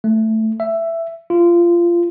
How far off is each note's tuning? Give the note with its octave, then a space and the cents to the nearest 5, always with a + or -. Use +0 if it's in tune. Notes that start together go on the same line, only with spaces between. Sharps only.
A3 +5
E5 +10
F4 -20